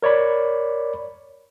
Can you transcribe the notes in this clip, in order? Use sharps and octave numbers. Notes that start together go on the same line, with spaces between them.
A#4 C#5 D5 B5